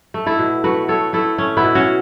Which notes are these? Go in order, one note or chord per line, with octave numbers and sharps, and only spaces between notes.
A3
E4 A4
B2
A3 F#4 B4
A3 A4 C#5
A3 E4 A4
A3 C#4
B3 E4
B2
C#4 F#4